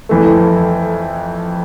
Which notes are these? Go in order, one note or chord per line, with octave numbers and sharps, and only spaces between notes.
F2 E3 A3